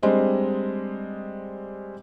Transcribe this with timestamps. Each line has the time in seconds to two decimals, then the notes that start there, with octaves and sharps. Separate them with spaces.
0.03 G3 G#3 C4 D4 D#5